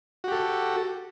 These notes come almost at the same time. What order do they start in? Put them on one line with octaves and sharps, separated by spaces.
F#4 G4 A4